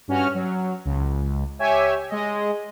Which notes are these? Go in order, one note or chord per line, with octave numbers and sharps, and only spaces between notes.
G2 C#4 F#4 F6
F#3
C#2
G4 C#5 E5 G#5
G#3 D#5